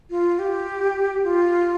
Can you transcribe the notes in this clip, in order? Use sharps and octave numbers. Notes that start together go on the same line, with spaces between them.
F4
G4
F4